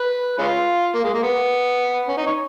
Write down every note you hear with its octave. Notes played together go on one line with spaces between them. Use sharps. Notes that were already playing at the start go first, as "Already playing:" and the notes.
Already playing: B4
G#3 C#4 F4
A#3
G#3
A#3
B3
C#4
D#4
C#5